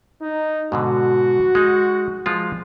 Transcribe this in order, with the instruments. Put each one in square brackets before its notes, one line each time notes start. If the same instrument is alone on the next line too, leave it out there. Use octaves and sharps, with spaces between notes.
[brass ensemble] D#4
[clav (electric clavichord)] G#2 B2 D3 [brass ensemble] F#4
[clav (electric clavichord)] G#3 D#4
F3 G#3 F4